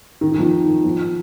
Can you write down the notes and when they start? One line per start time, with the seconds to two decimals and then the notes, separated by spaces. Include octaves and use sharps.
0.21 D#3
0.32 D#3
0.38 F3
0.43 D#3
0.84 F3